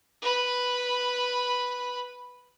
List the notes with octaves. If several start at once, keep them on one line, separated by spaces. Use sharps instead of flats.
B4 B5